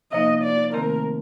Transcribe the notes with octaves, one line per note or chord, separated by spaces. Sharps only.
C3 F3 A#3 D#4 D#5
D5
C3 D#3 A3 C4 A#4